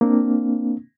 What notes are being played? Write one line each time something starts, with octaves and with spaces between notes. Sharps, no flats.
A#3 C4 D4